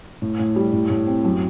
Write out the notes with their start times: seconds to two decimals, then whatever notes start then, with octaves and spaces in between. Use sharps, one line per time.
0.22 A2
0.39 A2
0.56 G3
0.72 A2
0.90 A2
1.07 C4
1.25 F#2